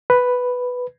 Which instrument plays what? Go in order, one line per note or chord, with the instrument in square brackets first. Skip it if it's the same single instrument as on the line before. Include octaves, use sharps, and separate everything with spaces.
[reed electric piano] B4